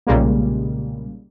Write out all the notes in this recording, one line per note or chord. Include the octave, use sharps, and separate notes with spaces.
B1 A#2 C#3 G3 G#3 A#3